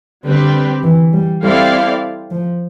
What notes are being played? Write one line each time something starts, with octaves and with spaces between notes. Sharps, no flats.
D3 G3 C4 G4 B4
E3
G3
G3 C4 E4 A4 D5 F5
F3